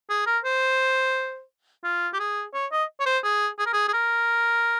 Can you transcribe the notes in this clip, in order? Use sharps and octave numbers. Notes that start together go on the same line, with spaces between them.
G#4
A#4
C5
F4
G4
G#4
C#5
D#5
C#5
C5
G#4
G#4
A#4
G#4
G#4
A#4